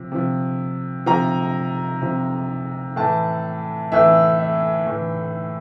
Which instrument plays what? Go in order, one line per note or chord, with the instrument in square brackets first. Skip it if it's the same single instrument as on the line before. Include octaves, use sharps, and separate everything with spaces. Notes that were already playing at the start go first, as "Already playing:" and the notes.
Already playing: [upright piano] C3 F3
C3 F3
C3 F3 A#5
C3 F3
A2 E3 A5
A2 E3 E5
E5
A2 E3